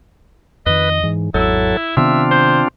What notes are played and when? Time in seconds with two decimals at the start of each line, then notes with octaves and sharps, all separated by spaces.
0.66 F2 D#3 B4 D#5
1.03 G#2 E3
1.34 G#1 E2 F#3 E4 A4
1.97 C3 D#3 B3 C4 D4 F4 E5
2.31 C5